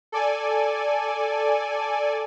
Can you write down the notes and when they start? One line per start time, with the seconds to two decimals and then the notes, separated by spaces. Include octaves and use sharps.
0.12 A4 D5 G#5